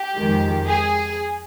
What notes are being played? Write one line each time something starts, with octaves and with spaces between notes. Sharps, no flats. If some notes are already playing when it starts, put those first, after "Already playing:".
Already playing: G4
F2 D#3 G#3
G#4